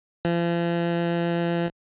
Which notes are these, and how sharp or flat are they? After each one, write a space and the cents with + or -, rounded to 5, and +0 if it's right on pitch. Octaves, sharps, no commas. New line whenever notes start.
F3 -40